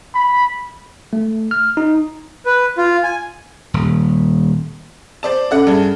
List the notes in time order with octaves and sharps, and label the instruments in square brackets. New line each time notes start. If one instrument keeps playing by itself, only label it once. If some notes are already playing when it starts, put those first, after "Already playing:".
[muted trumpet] B5
[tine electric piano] A3
F6
D#4
[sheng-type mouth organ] B4
F4
G#5
[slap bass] D#1
[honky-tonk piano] C5 D5 A5
[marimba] C#4 A4 E5 [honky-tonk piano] D5 F#5
[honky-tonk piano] G2 G#4